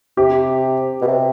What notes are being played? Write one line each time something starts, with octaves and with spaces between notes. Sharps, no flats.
C3 G4
B2
C3